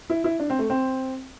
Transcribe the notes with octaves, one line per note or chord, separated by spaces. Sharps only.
E4
E4
D4
C4
A3
C4